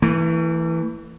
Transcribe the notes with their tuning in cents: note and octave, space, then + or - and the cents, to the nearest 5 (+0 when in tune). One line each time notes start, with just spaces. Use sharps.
E3 +0 A3 +45